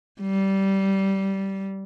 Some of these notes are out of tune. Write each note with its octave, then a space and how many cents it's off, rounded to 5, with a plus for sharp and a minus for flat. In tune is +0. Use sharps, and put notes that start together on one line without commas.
G3 -15